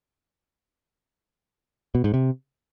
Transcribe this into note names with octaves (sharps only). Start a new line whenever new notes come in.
B2
G#2
C3